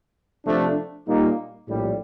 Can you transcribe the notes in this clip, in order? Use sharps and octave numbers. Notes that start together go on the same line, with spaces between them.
C3 F3 A3 D4
A#2 G3 A#3 D#4
A#1 A2 G3